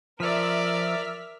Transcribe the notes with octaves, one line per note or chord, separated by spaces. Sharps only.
F3 A#4 D5 E5 F6 B6